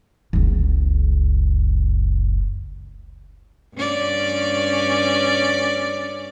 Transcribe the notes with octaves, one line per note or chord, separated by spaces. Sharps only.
F#1 C#2
G2 C#4 D5